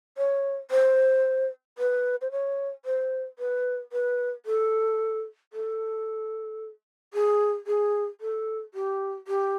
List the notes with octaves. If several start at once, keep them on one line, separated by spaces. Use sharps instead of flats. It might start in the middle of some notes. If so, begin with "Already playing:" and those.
C#5
C5
B4
C5
C#5
C5
B4
B4
A4
A4
G#4
G#4
A4
G4
G4